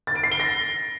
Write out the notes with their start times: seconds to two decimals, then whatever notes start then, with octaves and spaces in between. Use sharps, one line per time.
0.07 A6
0.15 D7
0.23 C7
0.32 G7
0.40 A#6